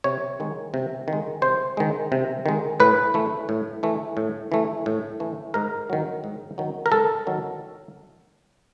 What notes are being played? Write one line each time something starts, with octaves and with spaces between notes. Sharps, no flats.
C3 C#5
D#3 G#3
C3
D#3
G#3
C3 C5
D#3 G#3
C3
D#3 G#3
A2 B4
E3 A3
A2
E3 A3
A2
E3 A3
A2
E3 A3
G#2 A#4
D#3 F#3
G#2
D#3 F#3
A#4
G#2 A4
D#3 F#3